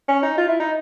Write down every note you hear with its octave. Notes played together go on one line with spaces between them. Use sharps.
C#4
D#4
F4
E4
D#4